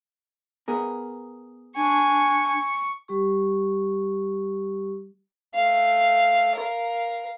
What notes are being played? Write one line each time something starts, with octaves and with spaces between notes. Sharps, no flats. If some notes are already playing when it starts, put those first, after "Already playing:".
B3 G#4 A#4
D4 G#5 C#6
G3 G4 C#6
A3 F5
A#4 F5